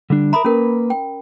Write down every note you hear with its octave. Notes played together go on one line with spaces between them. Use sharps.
D3 G3 D4
A#4 E5 A#5 B5 D#6
A#3 C#4 A#4 B4
G5